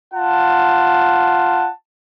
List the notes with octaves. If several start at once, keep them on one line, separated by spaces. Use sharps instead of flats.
F4 F#5 A5